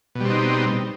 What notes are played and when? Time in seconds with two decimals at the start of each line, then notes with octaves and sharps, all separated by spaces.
0.15 B2
0.20 G3
0.25 C4
0.30 D#4